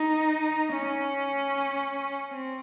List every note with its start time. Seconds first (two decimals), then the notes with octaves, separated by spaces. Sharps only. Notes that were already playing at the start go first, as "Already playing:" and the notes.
Already playing: D#4
0.73 C#4
2.31 C4